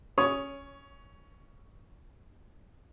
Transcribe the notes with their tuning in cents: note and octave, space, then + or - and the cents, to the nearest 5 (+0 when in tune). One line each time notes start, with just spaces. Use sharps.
C#4 -5 C#5 +15 D#6 +0